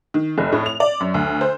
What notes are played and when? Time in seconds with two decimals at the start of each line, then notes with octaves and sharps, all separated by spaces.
0.14 D#3
0.38 F1
0.52 A2
0.66 F7
0.80 D5
1.00 F#2
1.14 D2
1.41 C5